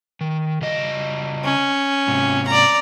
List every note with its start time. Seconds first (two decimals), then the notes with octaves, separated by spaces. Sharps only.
0.21 D#3
0.62 C#3 G3 D#5
1.44 C#4
2.08 G#2 C3
2.47 D5 A#5